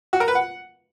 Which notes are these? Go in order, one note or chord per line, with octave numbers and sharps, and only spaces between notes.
F#4
A#4
B4
F#5